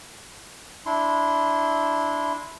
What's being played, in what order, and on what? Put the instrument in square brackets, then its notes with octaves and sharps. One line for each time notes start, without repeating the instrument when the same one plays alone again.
[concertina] D4 E4 C6